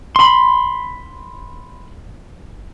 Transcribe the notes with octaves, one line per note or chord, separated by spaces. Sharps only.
B5 C6